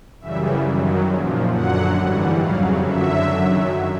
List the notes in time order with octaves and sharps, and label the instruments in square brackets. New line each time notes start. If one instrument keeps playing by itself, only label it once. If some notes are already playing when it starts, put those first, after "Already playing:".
[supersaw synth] F#2 C#3 E3 G3 E5
F#2 D#3 F#3
A#2 F3
F#2 D3 F#3 F#5
G#2 E3 G3
F2 C#3 F#3 F5
F#2 D3 F#3 E5
F#2 D#3 F#3